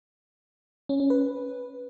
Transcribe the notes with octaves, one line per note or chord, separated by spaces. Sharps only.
C#4
C#4
B4